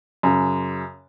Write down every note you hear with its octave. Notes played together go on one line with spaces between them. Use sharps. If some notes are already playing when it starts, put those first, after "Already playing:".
F#2 C#3